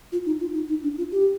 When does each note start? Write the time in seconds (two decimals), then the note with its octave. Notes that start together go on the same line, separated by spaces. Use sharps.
0.12 F4
0.26 D#4
0.40 F4
0.54 D#4
0.69 D#4
0.83 D4
0.98 F4
1.12 G4